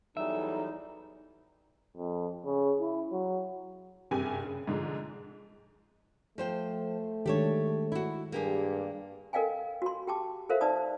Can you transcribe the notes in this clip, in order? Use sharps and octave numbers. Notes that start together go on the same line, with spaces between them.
E2 E3 F#3 G3 D#4 A4 E5
F2
C#3
E4
F#3
F#1 G2 C3 G4 G#5
C#3
G#2 D3 F3 G#3
F3 A3 C5 G5
D#3 G#3 D4 G4 A4 C#5
E4 F#4
G2 A#3 G4 G#4
A4 A#4 D#5 F5 G5 G#5
F#4 C6
G4 G5 A5 D6
A4 A#4 C5 E5 F5
D#4 B4 D5 A5 D#6